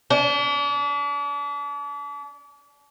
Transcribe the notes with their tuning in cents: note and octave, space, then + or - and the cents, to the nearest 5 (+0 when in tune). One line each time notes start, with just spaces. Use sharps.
D4 -40